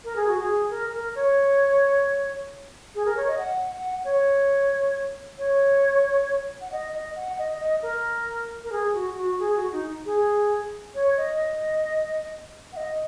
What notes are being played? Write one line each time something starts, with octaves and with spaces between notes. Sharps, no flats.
A#4
G#4
F#4
G#4
A#4
A#4
C#5
G#4
A#4
C#5
D#5
F#5
F#5
C#5
C#5
F#5
D#5
D#5
F#5
D#5
D#5
A#4
A#4
G#4
F#4
F#4
G#4
F#4
D#4
G#4
C#5
D#5
F#5
D#5